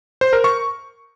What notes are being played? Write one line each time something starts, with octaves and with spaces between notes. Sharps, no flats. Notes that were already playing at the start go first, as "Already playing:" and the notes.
C5
A#4
C#6